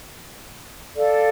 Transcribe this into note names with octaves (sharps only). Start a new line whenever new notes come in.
A4 D5 F5